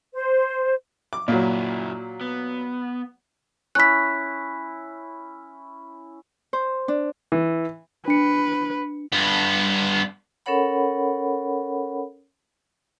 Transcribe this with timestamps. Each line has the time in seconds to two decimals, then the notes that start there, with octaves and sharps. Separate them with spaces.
0.14 C5
1.13 D6
1.28 F#2 A#2 F#3 E4
2.21 B3
3.75 C#4 E4 F#6 B6
6.53 C5
6.88 D4
7.32 E3
8.08 D4 B4 C#7
9.12 G2 B3
10.46 C#4 A4 A#4 C#5 F#5 B5